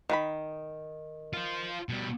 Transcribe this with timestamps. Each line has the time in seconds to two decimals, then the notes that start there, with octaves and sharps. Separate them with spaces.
0.09 D#3 F#4 B5
1.33 F4 C5
1.89 B2 G3